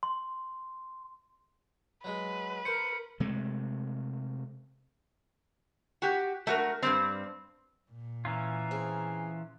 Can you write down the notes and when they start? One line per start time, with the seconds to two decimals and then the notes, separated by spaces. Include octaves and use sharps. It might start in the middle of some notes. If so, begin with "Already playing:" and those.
0.03 C6
2.04 F#3 G#3 B4
2.65 A#4 C5 C#7
3.20 C3 G#3 A3
6.02 F#4 G4
6.47 A3 F#4 A#4
6.82 G2 B2 G3 C4
7.91 A#2
8.25 E3 C#4 F4 A#5
8.71 C4 G#4